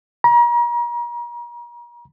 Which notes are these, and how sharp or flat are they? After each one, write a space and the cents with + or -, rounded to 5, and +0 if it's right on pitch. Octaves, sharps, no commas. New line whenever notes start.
A#5 +40